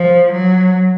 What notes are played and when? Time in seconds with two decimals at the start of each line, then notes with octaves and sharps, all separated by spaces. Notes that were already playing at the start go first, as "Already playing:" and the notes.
Already playing: F3
0.32 F#3